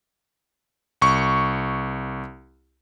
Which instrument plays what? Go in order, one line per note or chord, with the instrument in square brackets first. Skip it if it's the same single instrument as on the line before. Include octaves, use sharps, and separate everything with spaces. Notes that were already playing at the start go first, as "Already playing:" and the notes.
[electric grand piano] C2 C#6